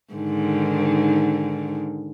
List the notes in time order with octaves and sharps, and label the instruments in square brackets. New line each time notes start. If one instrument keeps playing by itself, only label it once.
[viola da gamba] G#2 D3 D#3